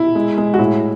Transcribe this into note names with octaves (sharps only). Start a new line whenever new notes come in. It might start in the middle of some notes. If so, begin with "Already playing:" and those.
Already playing: E4
G#3
G#3
F#4
A2 E4